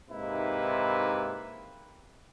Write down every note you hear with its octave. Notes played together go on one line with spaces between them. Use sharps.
G#2 C3 A#3 D#4 E4 B4